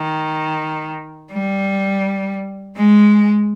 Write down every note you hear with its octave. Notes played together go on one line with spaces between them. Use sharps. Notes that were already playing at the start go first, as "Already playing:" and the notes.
Already playing: D#3
G3
G#3